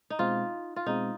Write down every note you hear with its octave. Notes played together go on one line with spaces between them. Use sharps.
D#4
B2 G#3 C4 F4
F4
B2 G#3 C4 D#4